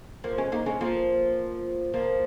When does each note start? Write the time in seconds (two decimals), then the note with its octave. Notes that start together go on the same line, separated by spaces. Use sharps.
0.24 F3 A#3
0.38 G#3 C#4
0.52 A#3 D#4
0.66 G#3 C#4
0.81 F3 A#3
1.94 F3 A#3